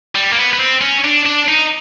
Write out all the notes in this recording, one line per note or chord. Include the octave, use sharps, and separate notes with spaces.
G3
A#3
B3
B3
C4
C#4
D4
D4
D#4